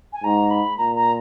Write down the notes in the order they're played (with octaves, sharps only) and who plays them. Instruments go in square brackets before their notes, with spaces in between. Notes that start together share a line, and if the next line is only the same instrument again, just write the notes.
[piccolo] G#5
[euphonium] G#2 [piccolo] A#5
[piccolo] B5
[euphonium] A#2 [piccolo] A#5
[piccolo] A#5